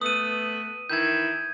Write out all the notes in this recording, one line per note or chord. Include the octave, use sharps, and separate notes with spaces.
A3 B3 D#6 D#7
D#3 E3 E4 G6 G#6